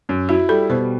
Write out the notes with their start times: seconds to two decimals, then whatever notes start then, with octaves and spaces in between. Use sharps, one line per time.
0.09 F#2
0.29 E4 F#4
0.49 G3 A4
0.69 B2 C5